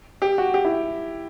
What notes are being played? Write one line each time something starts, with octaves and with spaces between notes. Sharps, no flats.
G4
F#4
G4
E4